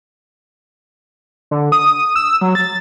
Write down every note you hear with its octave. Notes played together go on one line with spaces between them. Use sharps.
D3
D#6
E6
F#3
A6